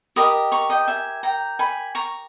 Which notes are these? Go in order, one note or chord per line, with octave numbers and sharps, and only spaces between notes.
G4 A#4 D#5 B5 D#6
A#5 C#6
D#5 G5
E5 G#5
G5 A#5
G#5 B5
A#5 C#6